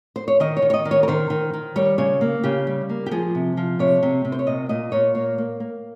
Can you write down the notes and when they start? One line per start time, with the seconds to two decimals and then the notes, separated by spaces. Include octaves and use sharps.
0.16 C5
0.28 C#5
0.40 D#3 D#5
0.57 C#5
0.62 D#3
0.70 C#5
0.74 D#5
0.85 D#3
0.91 C#5
1.03 A#4
1.08 D#3 C5
1.30 D#3
1.53 D#3
1.76 G3 C#5
1.98 C#3 C#5
2.21 A#3
2.43 C#3 G4
2.67 G3
2.89 A#3
3.06 G4
3.11 F3 G#4
3.35 C3
3.57 F3
3.79 C3 C#5
4.03 C3
4.25 C3
4.32 C5
4.39 C#5
4.47 A#2 D#5
4.69 A#2 D#5
4.92 A#2 C#5
5.15 A#3 C#5
5.38 A#3
5.60 A#3